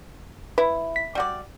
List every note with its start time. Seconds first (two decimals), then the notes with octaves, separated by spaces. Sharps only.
0.58 E4 B4
0.96 B6
1.15 G3 F#4 D5